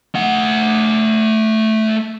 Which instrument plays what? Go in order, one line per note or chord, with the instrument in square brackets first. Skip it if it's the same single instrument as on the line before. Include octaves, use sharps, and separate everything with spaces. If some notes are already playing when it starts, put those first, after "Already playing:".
[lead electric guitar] A3 F#5